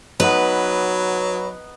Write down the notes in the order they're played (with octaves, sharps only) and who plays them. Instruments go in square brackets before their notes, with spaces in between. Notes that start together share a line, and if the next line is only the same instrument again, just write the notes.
[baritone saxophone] F#3 [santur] B3 D#4 [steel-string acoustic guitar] B4